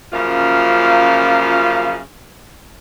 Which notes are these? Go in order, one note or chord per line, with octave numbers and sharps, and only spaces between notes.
F#2 C#3 F3 A#3 F4 F5